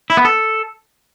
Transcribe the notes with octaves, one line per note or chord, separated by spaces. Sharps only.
E4
B3
A4